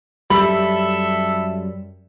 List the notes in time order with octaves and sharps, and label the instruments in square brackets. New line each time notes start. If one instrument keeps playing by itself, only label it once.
[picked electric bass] F#2 G3 [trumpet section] A4 E5 [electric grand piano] B5